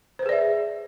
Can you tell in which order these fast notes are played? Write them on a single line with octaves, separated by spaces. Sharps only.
C5 B4 G#4 D5 E5